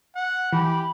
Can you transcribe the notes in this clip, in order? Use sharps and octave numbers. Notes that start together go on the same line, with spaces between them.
F#5
E3 G4 B5